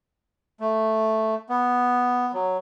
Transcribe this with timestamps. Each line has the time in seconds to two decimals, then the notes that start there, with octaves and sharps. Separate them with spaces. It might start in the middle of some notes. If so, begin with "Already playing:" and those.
0.60 A3
1.49 B3
2.34 F#3